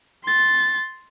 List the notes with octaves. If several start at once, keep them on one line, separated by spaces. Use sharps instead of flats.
C6 A6